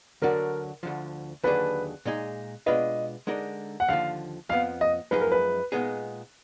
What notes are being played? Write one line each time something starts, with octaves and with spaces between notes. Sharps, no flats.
D2 D3 F#3 D4 F#4 A#4
D2 D3 F3
D#2 D3 F#3 D4 G#4 B4
A#2 G#3 D#4 G#4
B2 G#3 D4 F4 B4 D#5
D3 G#3 D#4 A#4 D5
F#5
D#2 D3 F3 F5
F2 F3 B3 F5
D#5
F#2 F3 G#3 D#4 G#4 B4
A#4
B4
A#2 G#3 B3 D#4 G#4